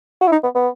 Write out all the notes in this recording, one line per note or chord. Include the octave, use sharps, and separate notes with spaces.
F#4
E4
D#4
B3
B3